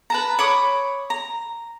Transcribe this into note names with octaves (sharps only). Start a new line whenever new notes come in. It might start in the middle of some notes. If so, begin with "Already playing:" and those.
B4 A5 A#5
C#5 B5 D6 D#6
A#5